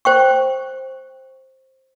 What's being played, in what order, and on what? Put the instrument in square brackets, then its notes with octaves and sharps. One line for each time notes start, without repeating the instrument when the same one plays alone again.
[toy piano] C5 G5 C#6